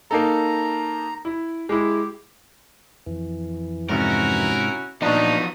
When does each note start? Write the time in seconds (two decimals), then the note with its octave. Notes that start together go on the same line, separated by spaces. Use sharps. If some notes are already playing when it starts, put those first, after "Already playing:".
0.11 A#3 D#4 A4 A#5
1.25 E4
1.69 G#3 E4 G4
3.06 F2 E3
3.89 G#2 C3 C#4 E4 F#4 A#4
5.02 A#2 F3 F#3 B3 D4 D#4 D#6